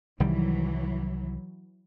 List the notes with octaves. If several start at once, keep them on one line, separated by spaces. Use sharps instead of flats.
C2 D#3 E3 F#3 G3